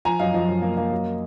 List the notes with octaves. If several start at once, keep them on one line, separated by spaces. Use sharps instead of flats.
F3 G#5 A#5
F#2 D#5 F5
F3 D#5
F#2
A#3
A#3
F#2